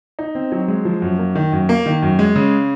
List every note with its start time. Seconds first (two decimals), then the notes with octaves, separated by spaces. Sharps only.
0.19 D#4
0.35 C4
0.52 F#3
0.68 G#3
0.85 F3
1.02 F#2
1.19 A#3
1.35 D#3
1.52 F#2
1.69 A#3
1.86 D#3
2.02 F#2
2.19 G#3
2.36 C#3